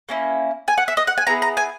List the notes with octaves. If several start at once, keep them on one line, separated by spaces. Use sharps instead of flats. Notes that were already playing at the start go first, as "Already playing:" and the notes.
A#3 C#4 E4
G#5
F#5
E5
D#5
F#5
G#5
B3 E4 G#4 A#5
A#5
G#5